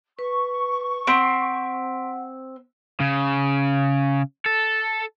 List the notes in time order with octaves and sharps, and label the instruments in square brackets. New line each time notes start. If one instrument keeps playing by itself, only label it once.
[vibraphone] B4 [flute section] C#6
[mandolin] C4 [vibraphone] F#5 [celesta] C6 B6 D7
[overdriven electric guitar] C#3
A4